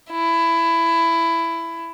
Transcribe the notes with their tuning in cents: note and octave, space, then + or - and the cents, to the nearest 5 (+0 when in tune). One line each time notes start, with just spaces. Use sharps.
E4 +15